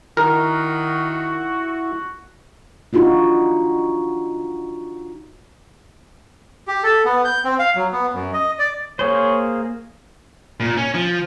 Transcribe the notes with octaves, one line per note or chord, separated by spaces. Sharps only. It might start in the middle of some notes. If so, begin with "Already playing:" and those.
D#3 E4 F#4 A#4
D4 D#4 F4 F#4
G4
A4
B3
G6
C4
F5
F#3
B3
F#2
D#5
D5
A#3 G#4 C5 C#5
A#2
C#4
F3